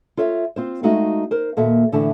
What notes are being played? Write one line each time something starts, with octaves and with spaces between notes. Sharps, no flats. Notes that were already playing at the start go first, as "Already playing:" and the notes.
F4 A4 C#5 E5
C4 F4 C5
G#3 A3 D#4 F#4 A4 F5
A#4 C5
D#2 A#2 A#3 F#4 A4 E5
A2 D3 E3 A3 A5